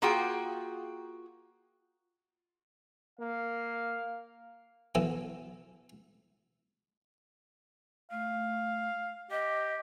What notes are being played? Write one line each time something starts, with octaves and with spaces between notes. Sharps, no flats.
A#3 F4 F#4 G#4 G5
A#3 F5
B1 E3 A4 G#5 A5
A3 F5
G4 D#5